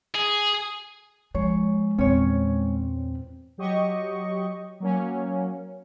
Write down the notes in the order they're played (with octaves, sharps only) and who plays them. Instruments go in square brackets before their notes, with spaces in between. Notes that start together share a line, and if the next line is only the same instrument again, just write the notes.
[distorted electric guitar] G#4
[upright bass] F3 [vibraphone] G#3 [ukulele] C#5
[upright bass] E2 A#2 [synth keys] C4 [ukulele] C#4 C#5
[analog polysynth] F#3 G4 D#5 C#6
F#3 A#3 C#4